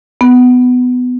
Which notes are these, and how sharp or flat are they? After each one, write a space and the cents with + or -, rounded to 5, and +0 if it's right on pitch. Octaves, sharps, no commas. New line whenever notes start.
B3 +15